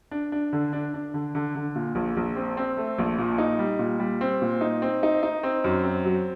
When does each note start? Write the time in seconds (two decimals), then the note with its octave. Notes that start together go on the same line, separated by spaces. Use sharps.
0.11 D4
0.32 D4
0.53 D3
0.73 D4
0.94 D4
1.14 D3
1.35 D3
1.55 D3
1.75 A#2
1.95 A#1
2.17 A#1
2.36 C4
2.57 C4
2.77 A3
2.99 A#1
3.18 A#2
3.38 D#4
3.59 G3
3.79 A#2
4.00 G3
4.21 C4
4.42 A#2
4.61 D#4
4.82 C4
5.03 D#4
5.23 D#4
5.43 C4
5.64 F#2
5.84 C4
6.05 F#3